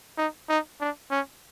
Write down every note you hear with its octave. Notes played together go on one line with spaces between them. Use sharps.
D#4
D#4
D4
C#4